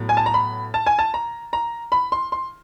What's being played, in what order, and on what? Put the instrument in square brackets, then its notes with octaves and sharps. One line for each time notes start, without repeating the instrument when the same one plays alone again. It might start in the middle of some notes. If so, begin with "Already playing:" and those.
Already playing: [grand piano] A2 F#3 B3
G#5
A5
A#5
B5
A5
G#5
A5
A#5
A#5
B5
C6
C6